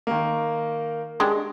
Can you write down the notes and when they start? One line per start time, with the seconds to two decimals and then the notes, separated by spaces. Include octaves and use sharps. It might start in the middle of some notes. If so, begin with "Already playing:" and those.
0.07 D#3 A#3
1.20 G#3 D4 G4